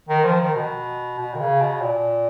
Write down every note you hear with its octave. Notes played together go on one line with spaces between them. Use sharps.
D#3
F3
D#3
B2
B2
D#3
C#3
B2
A#2